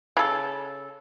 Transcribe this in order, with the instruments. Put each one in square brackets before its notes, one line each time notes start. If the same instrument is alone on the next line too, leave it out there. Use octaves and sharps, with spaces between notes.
[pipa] C#3 A4